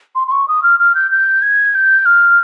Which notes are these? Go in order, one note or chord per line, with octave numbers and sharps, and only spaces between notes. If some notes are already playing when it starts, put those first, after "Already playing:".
C6
C6
C#6
D#6
F6
F6
G6
G6
G#6
G6
F6